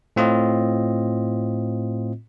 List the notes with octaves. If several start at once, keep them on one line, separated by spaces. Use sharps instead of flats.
A2 C4 F4 D#5